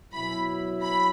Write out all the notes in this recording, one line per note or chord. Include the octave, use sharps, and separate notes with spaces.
B2 F#3 E4 B5
B5